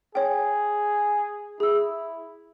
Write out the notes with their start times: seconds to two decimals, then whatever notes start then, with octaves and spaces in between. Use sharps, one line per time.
0.15 G#4 C#5 G5
1.60 E4 G#4 E6